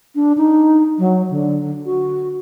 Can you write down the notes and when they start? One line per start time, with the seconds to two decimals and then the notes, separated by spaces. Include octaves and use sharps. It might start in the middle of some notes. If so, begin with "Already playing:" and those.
0.15 D4
0.37 D#4
0.99 F#3
1.31 D3
1.86 F#4